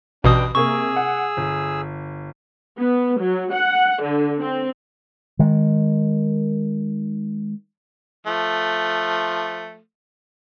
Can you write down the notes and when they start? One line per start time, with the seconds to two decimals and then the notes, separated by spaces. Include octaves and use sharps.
0.24 A1 B2 D4 B4 G5 D#6
0.55 C3 A#3 G#4 A#4 C#6 E6
0.96 F#5
1.37 G1
2.78 B3
3.19 F#3
3.52 F#5
4.02 D3
4.41 C4
5.39 D#3 G#3
8.26 F3 A3